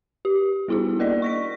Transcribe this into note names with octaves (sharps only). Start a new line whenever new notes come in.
G4
G3 B3 E4 F#4 G#4
A#3 A#4 D5 D#5
C#6 A#6 B6